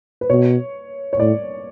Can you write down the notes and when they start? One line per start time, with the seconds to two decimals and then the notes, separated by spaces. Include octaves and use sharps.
0.21 B4
0.30 B2 C#5
1.13 C#5
1.19 A2 D5